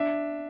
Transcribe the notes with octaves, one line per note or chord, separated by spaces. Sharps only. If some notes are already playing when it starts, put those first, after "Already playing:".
Already playing: D4 E5